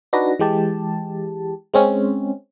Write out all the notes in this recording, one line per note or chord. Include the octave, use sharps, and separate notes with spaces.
D4 D#4 F#4 B4 A#6
E3 G#3 G4 A5
G#3 C4 C#4